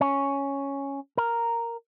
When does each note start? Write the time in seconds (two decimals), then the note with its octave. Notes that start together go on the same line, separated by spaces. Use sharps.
0.01 C#4
1.18 A#4